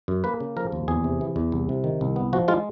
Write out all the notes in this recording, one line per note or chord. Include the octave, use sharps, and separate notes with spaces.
F#2
A#3 B4
C#3
F3 A#4
D#2
E2 G#4
C3
E3
E2
C2
C3
D#3
C2
B3
F3 F#4
G#3 F4